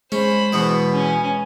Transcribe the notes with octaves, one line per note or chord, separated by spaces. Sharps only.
G#3 C#4 C5 B5
E2 B2 B3
C#4 G#5